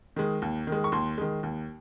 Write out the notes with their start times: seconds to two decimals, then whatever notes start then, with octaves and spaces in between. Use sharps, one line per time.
0.16 D#3 G#3
0.42 D#2
0.67 D#3
0.72 G#3
0.84 C#6
0.92 D#2 C6
1.18 D#3 G#3
1.43 D#2